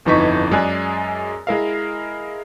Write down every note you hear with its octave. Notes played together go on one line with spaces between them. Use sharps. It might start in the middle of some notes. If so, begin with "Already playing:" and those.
G1 F2 E3 D#4 C#6 B6
F#2 G#3 G#4 D5 G#5 F#6
G#3 E4 A#4 E5 F5